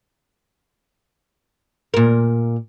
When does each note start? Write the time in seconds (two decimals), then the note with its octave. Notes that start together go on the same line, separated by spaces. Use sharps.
1.94 A#2 A#4